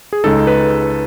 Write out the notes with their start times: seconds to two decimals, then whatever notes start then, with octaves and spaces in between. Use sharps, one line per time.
0.13 G#4
0.24 C#2 C#3 G#3 D#4 A4
0.47 B4